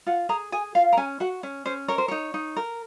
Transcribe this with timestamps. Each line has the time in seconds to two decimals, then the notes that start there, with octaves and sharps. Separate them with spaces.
0.07 F4 F#5
0.29 G#4 A#5
0.52 G#4 G#5
0.75 F4 F5
0.93 A#5
0.97 C#4 G#5
1.20 F#4 F#5
1.43 C#4
1.66 C#4 C5
1.88 A#4 C#5
1.98 C5
2.08 D#4 C#5
2.34 D#4
2.56 A#4